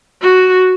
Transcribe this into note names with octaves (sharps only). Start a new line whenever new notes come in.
F#4